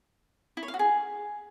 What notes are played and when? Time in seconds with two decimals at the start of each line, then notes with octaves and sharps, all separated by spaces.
0.57 E4
0.63 C#5
0.68 F5
0.74 F#4
0.79 G#4